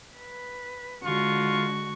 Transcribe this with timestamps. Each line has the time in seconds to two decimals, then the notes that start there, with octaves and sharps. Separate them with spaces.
0.16 B4
1.03 D3 G#3 F4 F#4 C#6